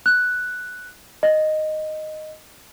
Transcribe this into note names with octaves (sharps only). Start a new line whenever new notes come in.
F#6
D#5